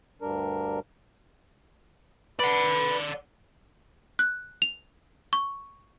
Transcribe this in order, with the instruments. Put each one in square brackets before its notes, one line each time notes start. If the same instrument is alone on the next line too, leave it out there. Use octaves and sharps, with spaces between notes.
[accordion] D2 G2 G3 D4 A#4
[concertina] B4 [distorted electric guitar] D5 F#5
[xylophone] F#6
F7
C#6